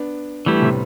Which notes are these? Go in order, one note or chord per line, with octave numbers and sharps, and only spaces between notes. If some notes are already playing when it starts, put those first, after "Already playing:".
Already playing: B3 D4
E3 G3 A3 B3 E4 G4
A2 C3